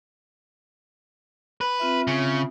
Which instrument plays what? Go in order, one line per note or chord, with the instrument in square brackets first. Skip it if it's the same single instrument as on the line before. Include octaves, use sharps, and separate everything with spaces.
[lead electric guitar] B4
[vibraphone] C4 F4 E5
[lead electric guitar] C#3